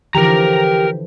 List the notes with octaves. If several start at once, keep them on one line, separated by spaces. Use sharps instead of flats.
D3 E3 F3 G4 A#4 A#5